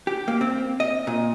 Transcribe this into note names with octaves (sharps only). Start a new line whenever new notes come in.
G4
A#3
C4
D#5
A#2